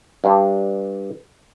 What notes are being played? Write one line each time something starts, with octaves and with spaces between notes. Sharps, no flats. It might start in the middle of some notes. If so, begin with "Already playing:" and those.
G2 D4